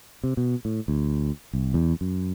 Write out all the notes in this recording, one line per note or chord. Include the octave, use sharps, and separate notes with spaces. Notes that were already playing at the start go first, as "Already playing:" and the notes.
C3
B2
A2
D2
C2
E2
F#2